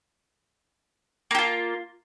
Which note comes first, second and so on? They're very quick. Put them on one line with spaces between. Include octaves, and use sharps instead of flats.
A#3 G4 F4